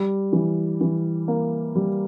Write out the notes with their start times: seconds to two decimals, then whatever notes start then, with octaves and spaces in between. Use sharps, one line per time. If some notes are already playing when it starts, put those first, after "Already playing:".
Already playing: G3
0.33 E3
0.81 E3
1.28 A#3
1.75 G3